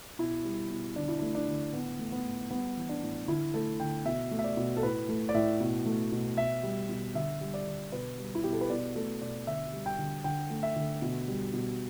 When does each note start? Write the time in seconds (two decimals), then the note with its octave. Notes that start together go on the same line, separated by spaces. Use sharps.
0.19 B2 E4
0.45 G3
0.70 B2
0.96 D3 D4
1.08 E4
1.19 D4
1.22 A3
1.35 D4
1.48 D3
1.73 A2 B3
1.99 A3
2.12 B3
2.25 A2
2.50 G3 B3
2.77 E3
2.89 D4
3.03 A2
3.28 D3 E4
3.54 A3 A4
3.80 D3 G5
4.05 B2 E5
4.31 A3
4.39 E5
4.44 D5
4.57 B2
4.77 A4
4.83 A2 B4
5.09 A3
5.29 D5
5.34 A2 E5
5.60 B2
5.86 A3
6.12 B2
6.37 B2 E5
6.63 G3
6.89 B2
7.15 D3 E5
7.41 G3
7.54 D5
7.66 D3
7.92 B2 B4
8.18 G3
8.35 E4
8.44 B2 G4
8.53 A4
8.61 B4
8.70 B2 D5
8.95 A3 A4
9.21 B2 D5
9.47 D3 E5
9.73 G3
9.86 G5
9.99 D3
10.24 D3 G5
10.50 A3
10.63 E5
10.76 D3
11.02 B2
11.28 G3
11.53 B2